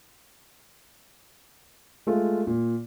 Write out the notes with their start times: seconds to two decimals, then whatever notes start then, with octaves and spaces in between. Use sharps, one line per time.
2.07 G#3 A3 F4
2.47 A#2